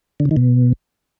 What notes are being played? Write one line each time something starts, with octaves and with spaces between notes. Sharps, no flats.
D3
C#3
D#3
B2